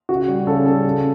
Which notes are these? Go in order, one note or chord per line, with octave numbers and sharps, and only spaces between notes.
C#3 F#4
G3
C#3 A4
G3 A4
C#3